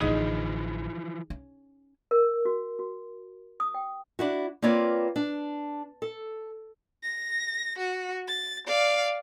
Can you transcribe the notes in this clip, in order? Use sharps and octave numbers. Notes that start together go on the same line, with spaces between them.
A1 D3 E3 F3 D#4 G#4 D#5
C#4
A#4
F#4
F#4
D#6
G5
D4 E4 F#4
A#3 C4 F4 B4 C#5 D5
D4
A4
A#6
F#4
A6
D5 F5